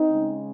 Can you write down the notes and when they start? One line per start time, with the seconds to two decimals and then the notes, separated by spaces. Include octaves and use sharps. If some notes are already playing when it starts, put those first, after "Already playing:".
Already playing: C4 D#4
0.09 C#3 G#3